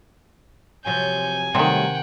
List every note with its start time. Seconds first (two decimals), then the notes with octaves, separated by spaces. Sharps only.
0.86 C3 F3 F#3 C#5 G#5 G6
1.55 C3 D#3 F#3 G3 A3 F#5 G5